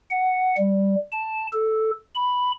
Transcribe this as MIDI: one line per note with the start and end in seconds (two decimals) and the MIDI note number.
0.10 0.55 78
0.57 0.95 55
1.12 1.47 81
1.53 1.91 69
2.15 2.52 83